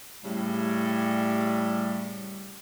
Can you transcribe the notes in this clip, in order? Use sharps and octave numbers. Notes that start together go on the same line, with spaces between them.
A2 C#3 G3